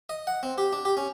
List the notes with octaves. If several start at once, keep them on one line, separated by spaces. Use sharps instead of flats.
D#5
F#5
C4
G4
D4
G4
C#4